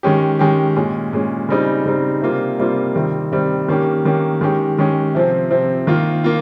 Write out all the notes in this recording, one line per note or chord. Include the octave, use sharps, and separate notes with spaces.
D#3 G#3 C#4 G4
D#3 G#3 C#4 G4
A#2 G#3 C#4
A#2 G#3 C#4
C#3 G3 C4 D#4
C#3 G3 C4 D#4
C3 G3 A#3 F4
C3 G3 A#3 F4
C3 D#3 G3 C4
C3 D#3 G3 C4
D#3 A#3 C#4 G4
D#3 A#3 C#4 G4
D#3 G#3 C#4 G4
D#3 G#3 C#4 G4
C3 F3 C4
C3 F3 C4
D#3 A#3 F4
A#3 F4